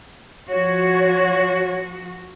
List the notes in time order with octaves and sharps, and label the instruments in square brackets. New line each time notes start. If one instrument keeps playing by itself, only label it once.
[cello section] F3 F#4 [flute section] C#5